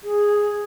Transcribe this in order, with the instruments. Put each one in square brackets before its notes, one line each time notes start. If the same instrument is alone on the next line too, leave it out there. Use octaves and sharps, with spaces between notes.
[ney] G#4